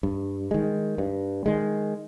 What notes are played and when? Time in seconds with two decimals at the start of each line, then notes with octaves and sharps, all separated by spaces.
0.03 G2
0.51 D#3 G#3
0.98 G2
1.46 D#3 G#3